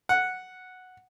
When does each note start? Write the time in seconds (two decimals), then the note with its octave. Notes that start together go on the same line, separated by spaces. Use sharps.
0.09 F#5